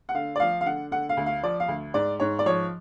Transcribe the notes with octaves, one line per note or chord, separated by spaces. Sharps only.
F#5
D3 F5
D5
F3 F5
F5
D3 F#5
D3 F#5
F5
D2
F5
F3 D5
F5
D2
G#2 D5
G#2 C#5
D5
F3 C#5